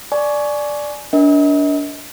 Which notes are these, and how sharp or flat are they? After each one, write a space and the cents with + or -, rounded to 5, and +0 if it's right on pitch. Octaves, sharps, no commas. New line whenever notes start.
D5 +0 G#5 +25 C#6 +10
D4 -25 A#4 +35 D#5 +40